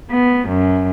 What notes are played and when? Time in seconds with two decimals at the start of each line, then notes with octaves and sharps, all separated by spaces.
0.11 B3
0.48 F#2